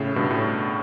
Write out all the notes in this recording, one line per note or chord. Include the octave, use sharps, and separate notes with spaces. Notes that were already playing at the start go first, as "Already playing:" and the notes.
Already playing: A2 C#3
G2 B2
A2